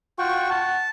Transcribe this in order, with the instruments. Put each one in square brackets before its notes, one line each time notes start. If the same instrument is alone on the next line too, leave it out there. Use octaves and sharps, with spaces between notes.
[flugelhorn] F4 [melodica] F#4 G5 C#6
[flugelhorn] F#5 [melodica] A5